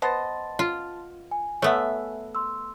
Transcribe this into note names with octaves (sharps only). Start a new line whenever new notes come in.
B3 C5 D#5 A5 C6 A6
F4
G#5
A3 B3 C#5 E5
C6 E6